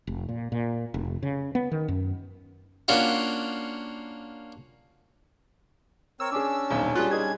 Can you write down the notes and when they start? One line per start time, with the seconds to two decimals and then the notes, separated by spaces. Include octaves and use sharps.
0.07 F1
0.29 A#2
0.52 A#2
0.94 F1
1.23 C#3
1.55 B3
1.72 D#3
1.88 F#2
2.88 A#3 C#4 D4 F4 F#4
6.20 C4 A#4 C#5 E6
6.32 C#4 D4 G#4 D6
6.70 D#1 B1 D#3
6.95 G3 F4 F#4 G#4 F#6
7.11 D#4 G#4 G#6